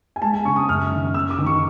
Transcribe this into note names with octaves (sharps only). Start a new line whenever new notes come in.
G#5
G#3 A5
G#5
C#3 C#6
D#6
F#2 F6
D#3
F#2 E6
D6
D#3
C#6